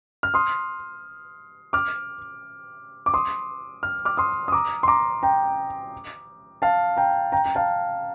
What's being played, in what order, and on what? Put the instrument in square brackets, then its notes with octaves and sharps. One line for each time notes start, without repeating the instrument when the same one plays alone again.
[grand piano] F6
C6 D#6
D6 F6
D6
C6 D#6
F6
D6 F6
C6 D#6
D#6
A#5 D6
C6
A#5 D6
G5 A#5
F5 A5
G5 A#5
G5 A#5
G5
F5 A5